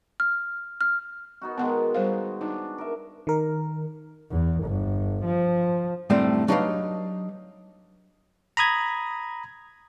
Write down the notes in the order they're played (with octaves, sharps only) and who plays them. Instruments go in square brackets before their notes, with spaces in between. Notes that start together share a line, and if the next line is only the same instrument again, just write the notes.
[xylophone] F6
F6
[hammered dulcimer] B3 D#4 F#4
[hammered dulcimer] D#3 G#3 [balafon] B3 F#5
[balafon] G3 C5 F5
[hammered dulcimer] D4 [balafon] D#4
[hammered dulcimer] A#4 E5
[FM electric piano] D#3 A#4
[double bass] E2
G1
F3
[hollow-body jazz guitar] F#2 A2 D3 G3 A3 C4
F#3 D4 D#4 G4 B4 F5
[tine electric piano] A#5 B5 D#6 G#6